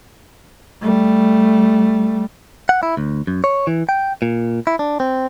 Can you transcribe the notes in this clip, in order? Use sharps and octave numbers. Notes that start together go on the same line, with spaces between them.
G3 A3
F#5
E4
D2
F#2
C#5
E3
G5
A#2
E4
D4
C4